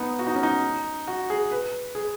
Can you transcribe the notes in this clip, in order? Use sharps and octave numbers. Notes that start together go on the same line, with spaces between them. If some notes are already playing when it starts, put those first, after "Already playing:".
Already playing: B3 D#4
F#4
D#4
C#4
D#4
F#4
G#4
B4
G#4